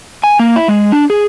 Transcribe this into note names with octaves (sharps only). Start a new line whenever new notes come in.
G#5
A#3
E4
G#3
D4
G#4